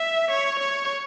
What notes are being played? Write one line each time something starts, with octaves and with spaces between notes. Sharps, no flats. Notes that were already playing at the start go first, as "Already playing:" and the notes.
Already playing: E5
C#5
C#5